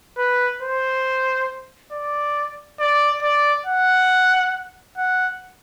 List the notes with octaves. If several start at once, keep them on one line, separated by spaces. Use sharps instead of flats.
B4
C5
D5
D5
D5
F#5
F#5